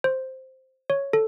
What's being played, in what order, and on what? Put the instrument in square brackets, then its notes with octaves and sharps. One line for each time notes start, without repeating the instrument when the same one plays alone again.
[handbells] C5
C#5
A4